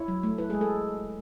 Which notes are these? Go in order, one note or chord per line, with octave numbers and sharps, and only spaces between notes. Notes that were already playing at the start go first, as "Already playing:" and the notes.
Already playing: E4 C#5
F#3
A3
E4 B4
G#3 G#4
A4